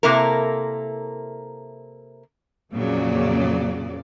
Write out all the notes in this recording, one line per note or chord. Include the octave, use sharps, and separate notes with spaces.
C3 A#3 E4 A4 A#4
F2 A#2 C#3 F#3 A#3 D5